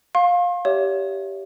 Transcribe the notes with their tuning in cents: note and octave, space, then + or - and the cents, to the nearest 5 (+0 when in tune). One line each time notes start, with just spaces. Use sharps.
F5 +15 C6 +45
G4 -5 C#5 +35 E5 +0